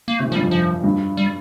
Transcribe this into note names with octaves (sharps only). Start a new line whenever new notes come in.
A#3
C3 A3
A#2
F3
G2 G3
F2
F3
G2
G3